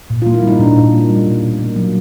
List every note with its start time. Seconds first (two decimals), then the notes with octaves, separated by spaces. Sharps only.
0.10 A#2
0.22 A#3 F4
0.34 E4
0.42 G3
0.47 D#4
0.59 A#2 D4
0.76 A#2
0.92 A#3
1.10 G3
1.26 B2
1.43 B2
1.59 A#3
1.76 F#3